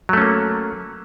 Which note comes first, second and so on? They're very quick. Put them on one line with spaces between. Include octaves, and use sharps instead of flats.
F#3 A3 C#4 A#3